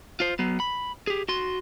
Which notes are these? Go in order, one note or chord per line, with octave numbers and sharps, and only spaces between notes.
F4 C5
F#3 B3
B5
G4 G#4
F#4 C6